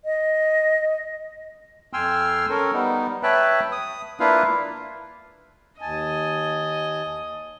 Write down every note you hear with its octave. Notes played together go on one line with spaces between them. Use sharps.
D#5
F2 G5 G#5 C6 E6 F6
C#4 A4 A#4
G3 B3 D#4
B4 C#5 E5 G5 A5 F#6
D#6
A#3 D4 E4 F4 B4 F5
D#2 D#5 G#5 A5